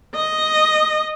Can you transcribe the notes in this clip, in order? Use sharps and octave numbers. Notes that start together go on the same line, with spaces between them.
D#5